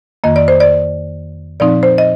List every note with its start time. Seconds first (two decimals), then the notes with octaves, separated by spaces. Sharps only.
0.24 F2 D#3 A#3 D#5
0.36 D5
0.48 C5
0.60 D5
1.60 A#2 F3 C4 D#4 D5
1.83 C5
1.98 D#5